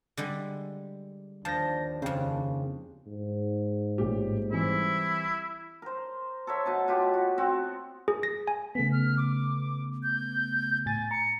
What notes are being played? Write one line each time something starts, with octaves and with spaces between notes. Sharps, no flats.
D3 G3 G#3
D#2 F3 D4 A5 G6 A#6
F2 C#3 C4 C5
G#2
A1 A#2 G4
E3 G3 C4 E4
A#4 C5
A4 A#4 C#5 E5
B2 D#5 A5
B2 F4 G4
F#4
C4 F#4
G#4
A#6
G#5
C#3 A3 B3 B6
F6
D6
G6
A2 G#5 A6
A#5 C#7